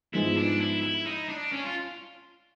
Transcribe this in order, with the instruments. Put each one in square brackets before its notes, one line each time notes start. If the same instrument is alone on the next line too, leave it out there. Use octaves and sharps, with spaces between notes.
[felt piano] G#2 F3 G#3 B3 D#4 [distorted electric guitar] E4
[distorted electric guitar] D4
E4
E4
D#4
D4
C#4
F4